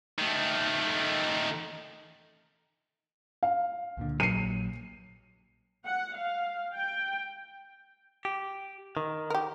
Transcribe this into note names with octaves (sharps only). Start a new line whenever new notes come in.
D#3 A3
F5
C#2 A#2 D3
A#1 A#2 F#3 C7 D#7
F#5
F5
G5
G4
D#3
G4 A#4